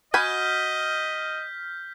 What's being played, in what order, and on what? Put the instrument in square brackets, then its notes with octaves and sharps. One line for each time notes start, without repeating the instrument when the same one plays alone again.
[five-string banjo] F#4 G#5 B5 [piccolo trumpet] D#5 [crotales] F6 G6 B6